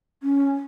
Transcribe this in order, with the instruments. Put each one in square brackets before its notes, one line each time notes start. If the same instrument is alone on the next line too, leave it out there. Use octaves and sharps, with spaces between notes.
[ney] C#4